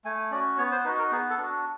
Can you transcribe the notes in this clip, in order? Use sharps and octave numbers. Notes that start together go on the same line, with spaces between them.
A3 G#5
C#4 F#4 D5
B3 C#5
C5
D#4 F#4 B4
A#4
B3 G#4
A4
D4 F#4